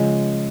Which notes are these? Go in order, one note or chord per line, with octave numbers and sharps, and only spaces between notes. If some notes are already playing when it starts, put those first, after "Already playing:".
Already playing: C#3 F3 G#3 C#4